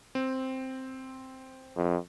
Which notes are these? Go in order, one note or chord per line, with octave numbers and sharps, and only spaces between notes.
C4
F2